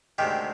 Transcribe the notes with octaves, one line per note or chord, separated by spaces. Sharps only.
D2 C3 D#3 G#3 G4